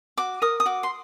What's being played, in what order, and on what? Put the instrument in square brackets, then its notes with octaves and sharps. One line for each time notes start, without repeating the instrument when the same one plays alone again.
[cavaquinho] F#4 D6
A#4 D#6
D#6
F#4 D6
C6